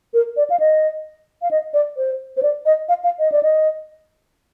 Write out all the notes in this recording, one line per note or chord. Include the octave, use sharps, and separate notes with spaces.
A#4
D5
F5
D#5
F5
D#5
D5
C5
C5
D5
D#5
F5
F5
D#5
D5
D#5